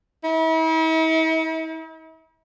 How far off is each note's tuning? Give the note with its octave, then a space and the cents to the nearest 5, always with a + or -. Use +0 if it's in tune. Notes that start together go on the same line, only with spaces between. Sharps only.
E4 -45